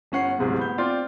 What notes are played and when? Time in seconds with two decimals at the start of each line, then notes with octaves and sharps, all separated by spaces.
0.12 G1 C#4 F#5 C7
0.38 D1 G#2 C3 G#3
0.58 B3 G6
0.78 C4 F4 D5